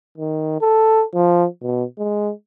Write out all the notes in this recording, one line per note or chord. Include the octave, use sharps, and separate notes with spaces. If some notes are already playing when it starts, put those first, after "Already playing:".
D#3
A4
F3
B2
G#3